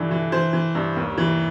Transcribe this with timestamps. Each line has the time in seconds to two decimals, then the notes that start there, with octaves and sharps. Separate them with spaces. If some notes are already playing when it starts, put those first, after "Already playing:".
Already playing: G2 D3 E3
0.11 E3
0.32 E3 C5
0.53 E3
0.75 G2
0.96 D#2
1.18 E3